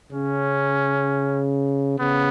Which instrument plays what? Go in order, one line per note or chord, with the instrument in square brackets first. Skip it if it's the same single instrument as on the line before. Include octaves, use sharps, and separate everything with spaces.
[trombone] C#3 [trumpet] C#4
[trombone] C#3 [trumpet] B3